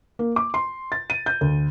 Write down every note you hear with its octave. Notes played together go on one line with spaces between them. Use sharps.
A#3
D6
C6
A6
D#7
G6
D2